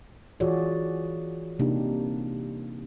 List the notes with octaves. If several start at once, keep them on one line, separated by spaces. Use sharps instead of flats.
E3 F4 F#4 G#4 C#5 D5
C3 A#3 D4 D#4 G4